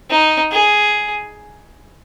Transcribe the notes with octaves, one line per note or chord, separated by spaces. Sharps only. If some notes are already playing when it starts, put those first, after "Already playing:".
D#4
G#4